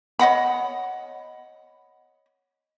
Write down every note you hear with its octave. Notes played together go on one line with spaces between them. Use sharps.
C#5 D#5 F#5 B5